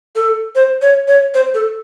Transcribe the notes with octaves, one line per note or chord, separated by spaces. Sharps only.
A4
C5
C#5
C#5
C5
A4